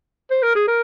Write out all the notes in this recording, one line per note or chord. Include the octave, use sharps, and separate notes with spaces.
C5
A#4
G#4
A#4